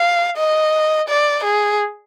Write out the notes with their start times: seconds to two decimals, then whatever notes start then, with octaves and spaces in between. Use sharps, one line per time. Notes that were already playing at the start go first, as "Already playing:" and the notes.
Already playing: F5
0.37 D#5
1.08 D5
1.44 G#4